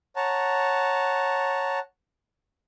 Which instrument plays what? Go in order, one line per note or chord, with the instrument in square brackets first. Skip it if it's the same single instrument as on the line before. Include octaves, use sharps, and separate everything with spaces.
[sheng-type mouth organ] C#5 F#5 A5 A#5